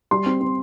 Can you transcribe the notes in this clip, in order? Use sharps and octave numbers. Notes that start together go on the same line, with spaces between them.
G3 C6
C4
C4